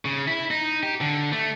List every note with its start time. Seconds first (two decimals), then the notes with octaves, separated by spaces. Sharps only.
0.05 C#3
0.27 E4
0.51 D#4
0.83 G4
1.01 D3
1.32 A3